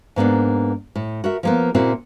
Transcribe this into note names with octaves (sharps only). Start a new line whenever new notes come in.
G#2 A#3 B3 D4
A2
F#4 A#4 E5
F3 A#3 B3
A#2 C#3 A#3 C4 E4 F#4